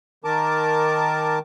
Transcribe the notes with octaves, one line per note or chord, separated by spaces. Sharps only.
D#3 A#4 A5 D6